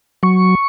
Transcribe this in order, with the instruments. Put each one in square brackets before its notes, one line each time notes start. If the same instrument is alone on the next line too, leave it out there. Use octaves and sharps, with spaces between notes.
[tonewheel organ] F#3 C#6